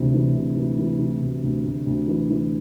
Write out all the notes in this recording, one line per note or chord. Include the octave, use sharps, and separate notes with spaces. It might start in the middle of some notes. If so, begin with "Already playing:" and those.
Already playing: D2 C3 E3
E3
C3
E3
E3
E3
D2
D2
D2
D2
E3
E3